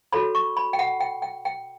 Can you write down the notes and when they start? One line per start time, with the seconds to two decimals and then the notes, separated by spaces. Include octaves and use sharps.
0.13 F#4 A4 C#5 B5
0.35 C#6
0.57 B5
0.73 G5
0.79 F#5
1.00 G5
1.22 G5
1.45 G5